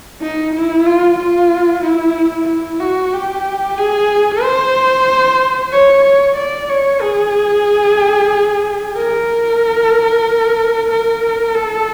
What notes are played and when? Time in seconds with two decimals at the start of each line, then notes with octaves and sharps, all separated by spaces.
0.21 D#4
0.53 E4
0.86 F4
1.18 F4
1.83 E4
2.48 E4
2.80 F#4
3.13 G4
3.78 G#4
4.42 C5
5.72 C#5
6.04 C#5
6.36 D5
6.69 C#5
7.02 G#4
8.96 A#4
10.90 A#4
11.55 A4